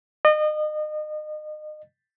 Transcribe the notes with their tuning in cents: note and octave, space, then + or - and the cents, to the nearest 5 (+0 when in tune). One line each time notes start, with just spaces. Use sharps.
D#5 -30